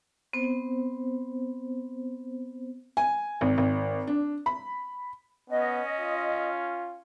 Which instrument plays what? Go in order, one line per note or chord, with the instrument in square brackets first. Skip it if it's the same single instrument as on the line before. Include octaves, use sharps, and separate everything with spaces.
[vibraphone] B3 C4 C5
[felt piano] G#5
G#1
G#1
D4
B5
[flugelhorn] B3 [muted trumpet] C#4 [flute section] D#5
[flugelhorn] F4